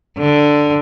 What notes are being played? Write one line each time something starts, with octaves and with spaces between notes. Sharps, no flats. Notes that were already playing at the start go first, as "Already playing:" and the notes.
D3